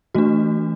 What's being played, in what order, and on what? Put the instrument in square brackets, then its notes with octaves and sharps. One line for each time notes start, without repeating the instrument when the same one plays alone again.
[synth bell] E3 A3 D4 F#4